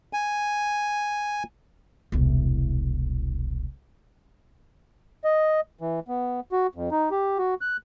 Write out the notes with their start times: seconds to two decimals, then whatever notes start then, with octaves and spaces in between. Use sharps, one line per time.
0.13 G#5
2.12 E1 C2
5.24 D#5
5.81 E3
6.08 B3
6.52 F#4
6.75 F2
6.91 D#4
7.11 G4
7.38 F#4
7.61 F#6